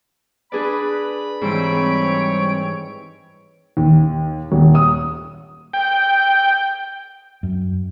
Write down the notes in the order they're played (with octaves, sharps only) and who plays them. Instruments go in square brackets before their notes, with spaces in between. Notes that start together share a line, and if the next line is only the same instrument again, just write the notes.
[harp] D4 G#4 D5 [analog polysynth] B4 [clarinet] B5
[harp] G#2 E3 [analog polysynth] G3 C4 D7 [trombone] C#5
[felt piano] D#2
D#1
D#6
[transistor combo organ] G5
[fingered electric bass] F#2